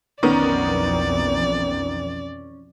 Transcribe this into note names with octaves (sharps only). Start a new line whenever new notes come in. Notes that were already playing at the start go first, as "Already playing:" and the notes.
B1 F2 D#3 E3 B3 C#4 A#4 D5